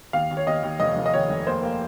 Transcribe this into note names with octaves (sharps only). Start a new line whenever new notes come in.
D#2 F5
D#2
C#5
D#2 D#5
D#2
F1 D#5
F1
D#5
D#2 C#5
F1
A#3 C5
A#3